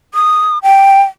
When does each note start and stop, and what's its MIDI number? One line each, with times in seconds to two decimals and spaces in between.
0.14 0.58 87
0.63 1.02 79